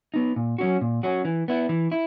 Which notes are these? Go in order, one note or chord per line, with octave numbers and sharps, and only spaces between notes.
B3 D#4
A#2
F#3 C#4 F#4
A#2
F#3 C#4 F#4
E3
B3 E4
E3
E4